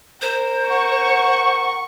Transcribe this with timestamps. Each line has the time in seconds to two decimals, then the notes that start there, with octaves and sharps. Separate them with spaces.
0.22 A#4 C5
0.70 F#5 C#6